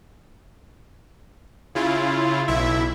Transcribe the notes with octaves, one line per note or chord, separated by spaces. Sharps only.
C#3 E4 F4
B1 E4 E5